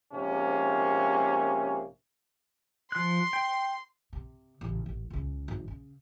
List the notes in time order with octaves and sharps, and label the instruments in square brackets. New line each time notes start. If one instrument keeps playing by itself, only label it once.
[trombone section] A#1 G#2 C3 A#3 C#4
[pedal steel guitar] F3 F#6 [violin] C6
[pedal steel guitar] G5
[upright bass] C3
A1 C#3
A1
C#2 C#3
G#1 F#3
C#3